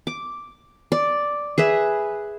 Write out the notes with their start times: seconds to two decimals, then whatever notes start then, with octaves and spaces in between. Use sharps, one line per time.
0.07 D6
0.92 D5
1.58 G#4 B4 E5